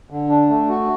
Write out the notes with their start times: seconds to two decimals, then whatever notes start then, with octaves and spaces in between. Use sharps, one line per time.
0.10 D3
0.29 D4
0.49 A3
0.69 F#4